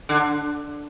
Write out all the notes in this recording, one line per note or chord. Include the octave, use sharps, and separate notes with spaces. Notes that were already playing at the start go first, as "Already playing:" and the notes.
D3